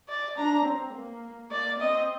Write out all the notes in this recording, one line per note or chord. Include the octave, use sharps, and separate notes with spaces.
D5
D4 A#5
C4
A#3
A#3 D5
C4 D#5